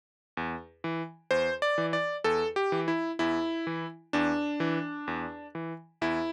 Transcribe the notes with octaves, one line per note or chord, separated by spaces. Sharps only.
E2
E3
E2 C5
D5
E3
D5
E2 A4
G4
E3
E4
E2 E4
E3
E2 D4
E3
E2
E3
E2 E4